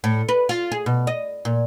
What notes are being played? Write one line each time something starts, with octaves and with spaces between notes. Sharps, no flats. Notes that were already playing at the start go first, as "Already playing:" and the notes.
A2
B4
F4
G#4
B2
D#5
A#2